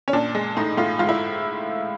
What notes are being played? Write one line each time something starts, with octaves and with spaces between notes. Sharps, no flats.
C#4
A#2 D4
G#3
A2 D#4
A2 F4
G#2 F4
E4